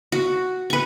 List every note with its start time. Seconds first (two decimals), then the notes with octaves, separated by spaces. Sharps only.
0.12 F#4
0.70 B4 C#6